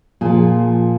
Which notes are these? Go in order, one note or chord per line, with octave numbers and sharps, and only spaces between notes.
A#2 F3 G#4